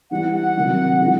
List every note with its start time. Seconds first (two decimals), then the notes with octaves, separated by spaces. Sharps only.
0.10 E3 G3 B3 F#5
0.34 F#5
0.56 C3 D#3 F#3 A#3 D4
1.00 E3 G#3 C#4 F4 G#4